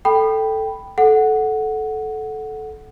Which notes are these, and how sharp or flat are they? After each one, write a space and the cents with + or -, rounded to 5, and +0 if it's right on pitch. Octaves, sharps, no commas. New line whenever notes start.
A4 +0 G5 -5 B5 +0
A4 -15 F#5 +0